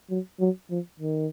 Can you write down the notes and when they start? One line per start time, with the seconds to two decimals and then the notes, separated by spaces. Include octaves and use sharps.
0.10 F#3
0.40 F#3
0.70 F3
1.00 D#3